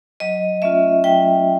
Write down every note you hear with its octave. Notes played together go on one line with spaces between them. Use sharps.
F#3 D#5
A3 C#4 F4 E5
F#3 G5